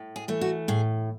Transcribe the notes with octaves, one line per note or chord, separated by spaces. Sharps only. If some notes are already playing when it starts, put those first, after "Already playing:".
Already playing: A2
G#4
E3 A3
F#4
A2 G#4